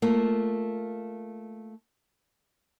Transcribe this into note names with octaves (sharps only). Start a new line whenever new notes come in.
A3 A#3 F4